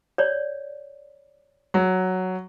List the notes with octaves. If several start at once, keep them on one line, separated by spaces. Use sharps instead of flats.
C#5 D5
F#3